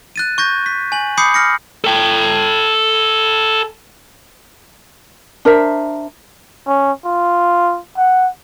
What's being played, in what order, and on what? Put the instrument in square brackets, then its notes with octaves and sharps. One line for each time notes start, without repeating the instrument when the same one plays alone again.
[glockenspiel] F#6 A6 D#7
C#6 G6 A#6
B6
G#5 F#7
B5 D6 D#6 G6 C7 C#7
F6 A#6 C#7
[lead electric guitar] A4 G5
[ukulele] D4 A#4 C5 E5
[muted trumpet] C#4
F4
F#5